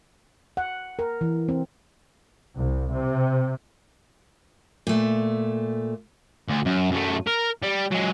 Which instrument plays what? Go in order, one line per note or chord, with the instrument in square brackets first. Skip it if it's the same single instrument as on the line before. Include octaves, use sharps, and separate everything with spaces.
[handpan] F#5
A#4
E3
C4
[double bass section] C2
C3
[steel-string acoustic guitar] A#2 A3
[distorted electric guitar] D2
F#2
F#2 A3
A#4
G3
F#3 G#3